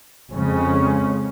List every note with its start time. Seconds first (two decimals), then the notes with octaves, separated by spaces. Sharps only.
0.31 F2 C#3 G#3 C#4